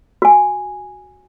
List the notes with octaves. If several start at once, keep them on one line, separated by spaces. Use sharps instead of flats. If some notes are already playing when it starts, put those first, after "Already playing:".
F#4 G#5